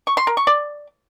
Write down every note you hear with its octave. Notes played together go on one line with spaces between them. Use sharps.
C#6
C6
A#4
C#6
D5